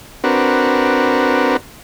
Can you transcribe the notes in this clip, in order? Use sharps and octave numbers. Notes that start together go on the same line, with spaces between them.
C4 D4 F#4 A#4 B4